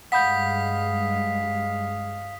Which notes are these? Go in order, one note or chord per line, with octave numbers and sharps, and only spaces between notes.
G2 G#3 F5 F#5 B5 D#6 G6 B6